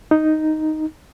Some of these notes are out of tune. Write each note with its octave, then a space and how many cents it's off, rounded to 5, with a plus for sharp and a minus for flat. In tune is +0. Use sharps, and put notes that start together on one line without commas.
D#4 +0